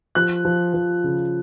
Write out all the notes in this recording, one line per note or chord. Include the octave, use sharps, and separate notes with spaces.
F3 F#6
F3
F3
C#3